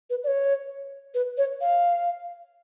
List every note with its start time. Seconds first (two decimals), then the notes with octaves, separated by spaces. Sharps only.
0.10 B4
0.24 D5
0.27 C#5
1.14 B4
1.38 C#5
1.61 F5